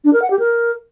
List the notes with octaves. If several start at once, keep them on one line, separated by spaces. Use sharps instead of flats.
D4
A#4
F#5
G4
A#4